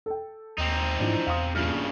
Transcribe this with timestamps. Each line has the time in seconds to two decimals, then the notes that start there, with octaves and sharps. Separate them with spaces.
0.06 A4 G5
0.58 D#2 C4 D#4
1.00 G#2 E3 F3 D4
1.27 E2 F5 C6 D#6
1.55 A#1 G2 C#3 F6